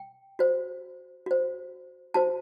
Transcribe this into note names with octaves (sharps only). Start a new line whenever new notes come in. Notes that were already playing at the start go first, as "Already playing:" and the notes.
Already playing: G5
F#4 C5
F#4 C5
F#4 C5 A5